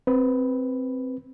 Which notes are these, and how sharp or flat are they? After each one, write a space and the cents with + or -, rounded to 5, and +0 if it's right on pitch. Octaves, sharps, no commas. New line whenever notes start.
C4 +0 B4 +0